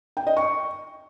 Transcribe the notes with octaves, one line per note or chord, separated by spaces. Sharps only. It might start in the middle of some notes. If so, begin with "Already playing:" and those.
G5
D#5
C#6